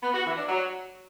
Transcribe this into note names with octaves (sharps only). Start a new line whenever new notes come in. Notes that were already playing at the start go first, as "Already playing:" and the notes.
B3
F#4
E3
D4
F#3